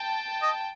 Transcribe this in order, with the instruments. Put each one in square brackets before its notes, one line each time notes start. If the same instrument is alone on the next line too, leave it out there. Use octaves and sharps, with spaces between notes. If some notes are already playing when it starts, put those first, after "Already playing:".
Already playing: [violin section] G5 A5
[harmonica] D#5